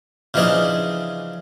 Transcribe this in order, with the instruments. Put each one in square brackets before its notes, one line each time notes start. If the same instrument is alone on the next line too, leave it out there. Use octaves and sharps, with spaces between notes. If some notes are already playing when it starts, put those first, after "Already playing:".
[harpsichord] C#3 E3 F3 D4 D#4 G#4